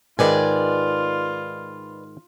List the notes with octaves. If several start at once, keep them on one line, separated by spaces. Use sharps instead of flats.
G#2 D#3 F4 B4 D5 G#5